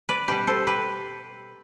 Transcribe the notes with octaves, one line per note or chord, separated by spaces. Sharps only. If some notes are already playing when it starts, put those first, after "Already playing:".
B4 D5
B2 G3 G4 B4
A4 C5
G4 B4